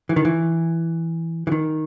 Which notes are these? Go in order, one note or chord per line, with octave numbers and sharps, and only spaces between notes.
E3
D#3
E3
E3
D#3